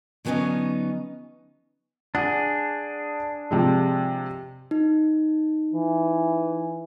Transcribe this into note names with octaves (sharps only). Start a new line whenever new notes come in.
D3 F#3 A3 B3 C#4 D#4
D4 G#4 F#5 D#6
C3 F3 G#3
D#4
E3